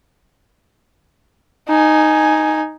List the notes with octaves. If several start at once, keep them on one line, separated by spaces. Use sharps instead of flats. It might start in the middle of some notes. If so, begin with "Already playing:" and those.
D#4 G#5